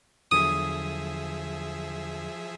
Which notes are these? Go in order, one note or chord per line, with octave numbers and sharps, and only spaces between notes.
E2 D3 F3 F#3 G#4 E5 D#6